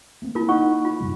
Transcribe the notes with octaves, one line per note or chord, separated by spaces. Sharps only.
A3 A#3 C4
A#3 E4 F4 A#4
D#4 F#5 C#6
F4
F#2 C3 G3